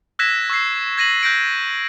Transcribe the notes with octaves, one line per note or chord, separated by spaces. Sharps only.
E6 F#6 G#6 A#6 B6 E7
C#6 E6 G#6 C7
G#6 A#6 D#7 F#7
F#6 G6 A#6 D7